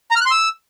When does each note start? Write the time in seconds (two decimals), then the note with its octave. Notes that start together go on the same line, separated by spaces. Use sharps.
0.11 A#5
0.16 F6
0.21 F#6
0.26 C6
0.31 E6